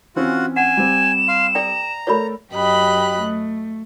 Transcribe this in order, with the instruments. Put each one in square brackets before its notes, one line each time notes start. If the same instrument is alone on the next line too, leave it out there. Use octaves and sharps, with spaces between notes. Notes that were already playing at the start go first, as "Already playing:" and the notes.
[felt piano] E3 C4 C#4 [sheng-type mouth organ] F4 F#4 F#5
[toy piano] F#5 [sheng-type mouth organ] G#5 [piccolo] E7
[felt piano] G3 C4
[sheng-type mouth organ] F5 C6
[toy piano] A4 D5 G5 [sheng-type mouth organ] A#5
[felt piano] A3 A4 A#4 [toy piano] C#5 D5 B5
[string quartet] F#2 G4 D#5 B5 F#6
A3